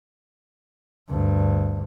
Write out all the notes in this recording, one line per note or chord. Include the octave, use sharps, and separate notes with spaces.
D2 G2